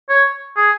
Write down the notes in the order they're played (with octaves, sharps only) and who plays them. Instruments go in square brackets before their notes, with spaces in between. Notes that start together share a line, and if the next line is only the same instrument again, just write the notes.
[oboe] C#5
G#4